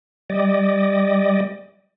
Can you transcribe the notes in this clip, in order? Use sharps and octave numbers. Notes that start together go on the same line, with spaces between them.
G3 D5 D#5